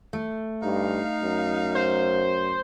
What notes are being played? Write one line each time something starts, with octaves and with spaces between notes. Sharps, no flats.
A3
G2 D#4 F5
F#2
C5